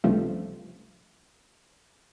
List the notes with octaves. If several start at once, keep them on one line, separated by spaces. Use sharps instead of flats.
C#2 G2 C3 F3 A3